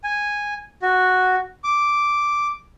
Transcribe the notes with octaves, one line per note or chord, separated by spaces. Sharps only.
G#5
F#4
D6